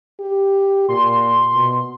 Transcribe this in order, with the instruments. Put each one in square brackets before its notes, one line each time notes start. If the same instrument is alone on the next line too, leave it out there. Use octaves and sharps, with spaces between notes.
[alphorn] G4
[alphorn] A#2 [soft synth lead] C6
[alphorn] B2